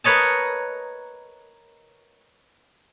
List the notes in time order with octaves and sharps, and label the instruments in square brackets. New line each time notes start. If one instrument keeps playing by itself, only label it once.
[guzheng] A#4 B4 C#5 D#5 A5